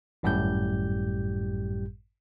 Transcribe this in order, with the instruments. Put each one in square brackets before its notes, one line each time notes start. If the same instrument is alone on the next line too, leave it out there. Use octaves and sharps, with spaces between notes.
[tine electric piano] G#1 F#2 A2 G3 G4 G6